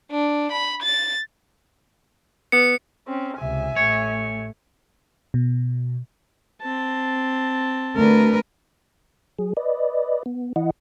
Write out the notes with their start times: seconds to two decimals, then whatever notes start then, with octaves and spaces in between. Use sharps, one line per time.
0.11 D4
0.52 B5
0.82 A6
2.52 B3 C#7
3.07 C4 C#4
3.38 C#2 C3 E5 G#5
3.76 A1 A3 C#5
5.34 B2
6.61 C4 A5
7.97 D2 A#4 B4
9.39 F#3 G#4
9.57 B4 D5 D#5
10.26 B3
10.56 E3 E4 D#5 F#5